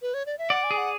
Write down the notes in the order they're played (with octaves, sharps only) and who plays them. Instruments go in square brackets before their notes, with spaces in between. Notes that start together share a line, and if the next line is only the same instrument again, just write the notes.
[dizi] B4
C#5
D5
E5
[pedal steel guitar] D5 [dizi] F#5
[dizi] G#5
[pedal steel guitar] G#4
[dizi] F#5